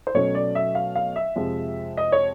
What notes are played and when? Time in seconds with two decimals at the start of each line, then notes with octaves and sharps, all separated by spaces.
0.07 C5
0.15 B2 F#3 A3 C#4 C#5
0.35 D5
0.55 E5
0.75 F5
0.95 F5
1.16 E5
1.36 F2 C3 F3 G#3
1.97 D#5
2.12 C#5